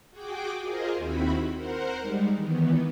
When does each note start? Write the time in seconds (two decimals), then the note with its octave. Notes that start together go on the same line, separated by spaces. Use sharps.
0.10 F#4 G#4 G5 D6
0.59 F4 G#4 A#4 C5 D#5
0.96 D#2 D#3 C4 E4 F#4 B5
1.54 A#4 C5 F#5
1.98 G3 G#3 D#4
2.35 D#3 E3 B3